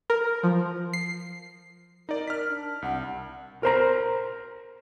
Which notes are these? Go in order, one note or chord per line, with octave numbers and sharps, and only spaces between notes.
A#4
F3
C7
D#4 A#4 D5
F6 B6
D4
C2 F#5
A#4 C5 A#5